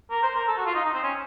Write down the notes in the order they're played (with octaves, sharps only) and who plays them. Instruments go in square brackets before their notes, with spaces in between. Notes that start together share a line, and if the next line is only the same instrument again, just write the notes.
[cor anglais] A#4
C5
A#4
A4
F#4
F4
D#4
D#4
C4
C#4